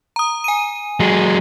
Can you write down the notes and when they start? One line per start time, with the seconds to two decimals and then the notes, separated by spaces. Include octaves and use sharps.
0.16 A#5 D#6
0.44 G#5 D#7
1.00 F#3 G#3